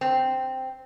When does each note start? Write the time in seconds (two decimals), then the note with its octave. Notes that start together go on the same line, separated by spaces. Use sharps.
0.01 C4